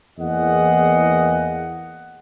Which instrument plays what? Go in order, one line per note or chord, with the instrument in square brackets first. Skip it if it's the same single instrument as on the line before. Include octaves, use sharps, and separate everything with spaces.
[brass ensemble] E2 A#3 G#4 D#5 F#5